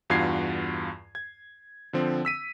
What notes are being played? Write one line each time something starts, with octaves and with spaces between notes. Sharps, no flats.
E2 G2 F4 F#4 G#6 C7
G#6
D3 F3 C4
E6 B6 D#7